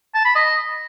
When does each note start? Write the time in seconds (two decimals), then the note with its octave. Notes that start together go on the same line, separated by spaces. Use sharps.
0.14 A5
0.25 B5
0.35 D#5